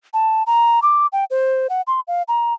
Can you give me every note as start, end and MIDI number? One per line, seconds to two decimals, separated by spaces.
0.14 0.43 81
0.47 0.80 82
0.83 1.07 86
1.13 1.24 79
1.31 1.67 72
1.70 1.82 78
1.87 2.00 84
2.08 2.23 77
2.28 2.54 82